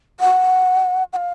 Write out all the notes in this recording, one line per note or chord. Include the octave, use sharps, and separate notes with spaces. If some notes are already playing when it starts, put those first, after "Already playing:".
F#5
F#5
F5